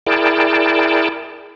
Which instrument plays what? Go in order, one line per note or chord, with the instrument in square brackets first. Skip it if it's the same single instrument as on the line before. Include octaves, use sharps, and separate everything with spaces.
[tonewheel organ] E4 G#4 A#4 D5 G5 A5